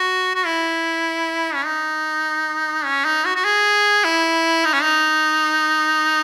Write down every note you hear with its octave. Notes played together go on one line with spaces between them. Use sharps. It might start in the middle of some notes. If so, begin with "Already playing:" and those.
Already playing: F#4
F#4
E4
C#4
D#4
C#4
D#4
F#4
F#4
G#4
E4
D#4
C#4
D#4